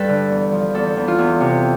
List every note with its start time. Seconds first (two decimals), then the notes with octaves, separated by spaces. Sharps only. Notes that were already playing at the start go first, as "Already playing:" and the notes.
Already playing: G2 A4 B4
0.09 D3
0.30 E2
0.52 F3
0.74 E2 A4
0.97 E2
1.08 F4
1.18 E2
1.40 C3